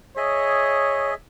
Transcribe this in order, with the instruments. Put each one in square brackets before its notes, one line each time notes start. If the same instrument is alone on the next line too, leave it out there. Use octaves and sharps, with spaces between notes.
[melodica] G#4 D#5 E5 [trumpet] C#5